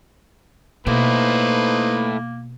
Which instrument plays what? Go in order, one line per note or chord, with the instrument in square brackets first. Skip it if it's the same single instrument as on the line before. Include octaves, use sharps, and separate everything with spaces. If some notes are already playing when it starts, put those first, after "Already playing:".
[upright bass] B2 [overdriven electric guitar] A3 E4 [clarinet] A#3 [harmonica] D#4 B4 C5